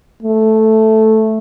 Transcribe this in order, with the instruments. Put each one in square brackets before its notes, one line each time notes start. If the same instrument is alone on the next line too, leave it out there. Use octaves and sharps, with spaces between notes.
[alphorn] A3